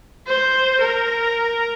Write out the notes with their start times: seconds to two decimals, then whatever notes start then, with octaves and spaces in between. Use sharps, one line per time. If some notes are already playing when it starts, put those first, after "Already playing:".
0.27 C5
0.82 A#4